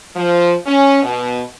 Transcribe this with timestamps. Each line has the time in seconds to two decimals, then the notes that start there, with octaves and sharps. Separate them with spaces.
0.15 F3
0.67 C#4
1.02 B2